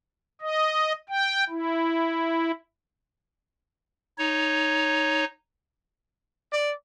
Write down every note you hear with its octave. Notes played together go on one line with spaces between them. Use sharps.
D#5
G5
E4
D#4 C#5
D5